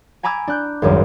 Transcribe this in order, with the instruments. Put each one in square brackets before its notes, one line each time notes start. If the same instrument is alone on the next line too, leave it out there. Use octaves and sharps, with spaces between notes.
[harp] G#5 A#5 B5 D6 E6 G#6
D4 F#6 G6
G#1 C#2 F#2 G3